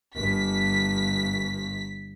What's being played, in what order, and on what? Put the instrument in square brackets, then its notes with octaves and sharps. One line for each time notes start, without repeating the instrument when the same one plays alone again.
[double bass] G1 [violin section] B6